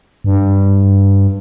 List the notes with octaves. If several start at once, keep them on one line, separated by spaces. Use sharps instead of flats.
G2